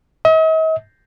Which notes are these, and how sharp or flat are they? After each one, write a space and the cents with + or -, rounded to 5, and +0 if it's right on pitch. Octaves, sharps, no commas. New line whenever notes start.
D#5 +45